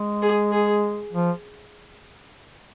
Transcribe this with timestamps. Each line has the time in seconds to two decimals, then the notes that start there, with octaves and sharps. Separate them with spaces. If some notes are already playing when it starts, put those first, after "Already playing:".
Already playing: G#3
0.22 G#4
0.52 G#4
1.13 F3